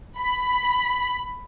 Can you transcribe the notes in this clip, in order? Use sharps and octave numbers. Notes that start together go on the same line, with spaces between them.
B5